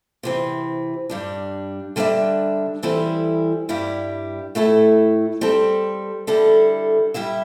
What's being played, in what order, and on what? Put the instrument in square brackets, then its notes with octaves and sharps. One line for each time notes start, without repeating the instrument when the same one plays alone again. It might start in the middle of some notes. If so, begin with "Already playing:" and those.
[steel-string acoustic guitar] C3 E3 C4
G2 G3 D4
D3 G3 D4 C5 E5
E3 G3 C4 E4 A4
G2 G3 E4 G4
A2 A3 E4 A4
G3 C4 A4
D3 G3 E4 A4
G3 E4 G4 E5